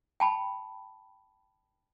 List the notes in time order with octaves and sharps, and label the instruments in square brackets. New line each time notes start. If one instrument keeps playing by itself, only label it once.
[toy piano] G5 A5 B5